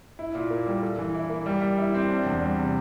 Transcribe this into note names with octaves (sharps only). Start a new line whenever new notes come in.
E4
A#2
A#3
G3
A4
E3
E4
A#3
G3
G3
E4
C4
D4
E2
G3
C3